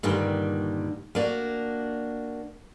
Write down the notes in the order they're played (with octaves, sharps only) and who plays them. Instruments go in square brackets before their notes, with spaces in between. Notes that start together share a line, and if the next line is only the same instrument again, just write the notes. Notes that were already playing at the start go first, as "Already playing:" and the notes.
[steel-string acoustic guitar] G2 A#2 D3 D#3 G3
A#3 D4 F#4